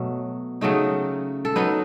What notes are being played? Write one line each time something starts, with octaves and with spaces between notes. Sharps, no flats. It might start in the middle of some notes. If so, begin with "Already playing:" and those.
Already playing: B2 F#3 A3
C#3 F#3 A3 D#4
A4
F#3 B3 D#4 B4